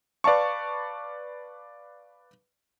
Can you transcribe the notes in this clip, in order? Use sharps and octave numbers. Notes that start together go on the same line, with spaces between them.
B4 D5 F5 A5 C#6